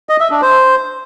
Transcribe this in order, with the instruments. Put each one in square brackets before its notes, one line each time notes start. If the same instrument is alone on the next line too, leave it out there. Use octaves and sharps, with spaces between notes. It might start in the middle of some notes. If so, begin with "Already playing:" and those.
[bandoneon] D#5
E5
D4
C5